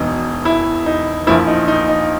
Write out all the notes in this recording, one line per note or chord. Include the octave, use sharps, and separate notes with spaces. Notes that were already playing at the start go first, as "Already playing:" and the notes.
Already playing: E1 E2 B2 D#4
E4
D#4
A#1 A#2 F3 E4
D#4
D#4
D#4